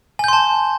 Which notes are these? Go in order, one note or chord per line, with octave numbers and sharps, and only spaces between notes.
G#5 A5 C6 G6